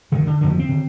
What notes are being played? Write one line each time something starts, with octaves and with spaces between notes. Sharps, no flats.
F2 D3 D#3
D3
F2 D3 D#3
F3
C4
D3